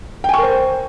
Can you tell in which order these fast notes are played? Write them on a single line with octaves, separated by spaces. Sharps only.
G5 G#5 C#6 A#4 C5